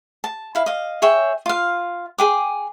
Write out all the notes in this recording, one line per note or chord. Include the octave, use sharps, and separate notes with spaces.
A5
E4 F5
D#5 F5
G#4 C#5 E5 G5
F4 F5
G#4 G5 D6